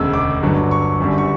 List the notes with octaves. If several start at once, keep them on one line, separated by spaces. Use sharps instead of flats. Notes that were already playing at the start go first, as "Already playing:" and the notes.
Already playing: E1 D2 C#3 E6
D6
G1 G2 D3 F#3
C#6
G1 F#2 D3 G3
C#6